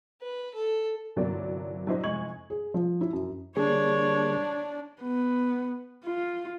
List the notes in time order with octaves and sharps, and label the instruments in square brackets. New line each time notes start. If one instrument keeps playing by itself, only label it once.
[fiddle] B4
A4
[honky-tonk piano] G1 C2 F#3 A#3 C4 D5
F#3 D4 E4 C5 D#5
F1 G#3 G#5 C#6 G#6 F#7
[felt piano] G#4
F3
E4
F#2
[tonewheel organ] D3 G3 A#3 [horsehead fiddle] D4 [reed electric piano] G#4 [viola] C#5
[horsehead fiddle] B3
F4